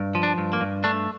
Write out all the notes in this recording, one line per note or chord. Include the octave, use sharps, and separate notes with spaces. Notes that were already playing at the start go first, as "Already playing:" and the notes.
Already playing: G2
F3
D4
G2
A#3
G2
A3 D4